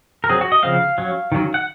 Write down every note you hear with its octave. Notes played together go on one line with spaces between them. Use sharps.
A#4
F#3 C4 G#4
F#4
D#5
C#3 F3 C4 F5
F#3 C#4
D#3 F#3 C#4
F#5